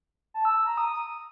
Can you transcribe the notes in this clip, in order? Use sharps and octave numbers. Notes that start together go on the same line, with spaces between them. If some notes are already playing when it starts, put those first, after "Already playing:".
A5
E6
E6
A#5
D#6